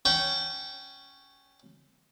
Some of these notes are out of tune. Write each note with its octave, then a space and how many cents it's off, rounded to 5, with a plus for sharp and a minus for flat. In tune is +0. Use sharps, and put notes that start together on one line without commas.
C#4 +0 G5 -20